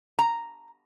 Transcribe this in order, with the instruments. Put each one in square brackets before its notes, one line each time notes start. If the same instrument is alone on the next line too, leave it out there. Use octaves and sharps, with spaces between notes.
[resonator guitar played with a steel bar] A#5